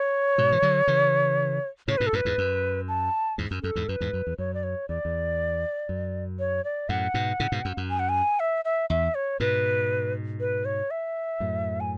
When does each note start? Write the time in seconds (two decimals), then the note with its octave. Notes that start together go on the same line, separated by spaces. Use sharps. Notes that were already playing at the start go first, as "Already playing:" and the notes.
Already playing: C#5
0.38 G#2 B2
0.52 E3
0.62 D3 F#3
0.87 C#3 E3
1.88 A2 C#3 C#5
1.97 G#2 B2 B4
2.07 A4
2.13 F#2 A2 B4
2.25 E2 G#2
2.38 F#2
2.88 A5
3.38 E2 G#2
3.51 F#2
3.63 F#2 A4
3.76 E2 G#2
3.88 F#2 B4
4.01 E2 G#2
4.13 F#2
4.27 E2
4.38 F#2 C#5
4.54 D5
4.63 C#5
4.89 E2 D5
5.05 E2
5.89 F#2
6.39 C#5
6.64 D5
6.89 F#2 A2 F#5
7.14 G#2 B2
7.40 A2 C#3
7.52 G#2 B2
7.65 F#2
7.77 F#2
7.90 G#5
7.99 F#5
8.09 G#5
8.40 E5
8.65 E5
8.90 E2 E5
9.15 C#5
9.40 G#2 B2 B4
10.40 B4
10.65 C#5
10.91 E5
11.40 F#2 A2
11.80 G#5